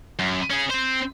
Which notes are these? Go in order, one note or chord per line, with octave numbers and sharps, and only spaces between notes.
F#2
C#4 G#4
C4 C5